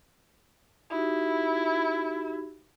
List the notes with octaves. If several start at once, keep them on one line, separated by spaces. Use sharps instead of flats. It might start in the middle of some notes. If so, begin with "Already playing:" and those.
D#4 E4 F#4 G4